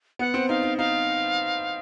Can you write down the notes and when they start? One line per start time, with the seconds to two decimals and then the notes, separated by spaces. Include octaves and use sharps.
0.19 B3 F#5
0.34 C4
0.49 D#4 F5
0.63 D#4
0.78 D#4 F5